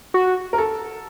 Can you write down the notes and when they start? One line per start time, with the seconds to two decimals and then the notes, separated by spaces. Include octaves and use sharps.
0.14 F#4
0.53 A#4
0.58 A4